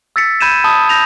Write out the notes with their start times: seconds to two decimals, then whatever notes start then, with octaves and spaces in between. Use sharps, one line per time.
0.16 E6 A6 B6 C#7
0.41 B5 G6 G#6 D#7 E7
0.64 A5 B5 D#6
0.89 G6 A#6 F7